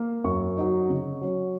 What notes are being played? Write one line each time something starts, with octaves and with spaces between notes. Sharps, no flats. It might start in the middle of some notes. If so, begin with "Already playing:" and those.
Already playing: A#3
F#2 C#6
F#3 D#4
C#3
F#3 C#4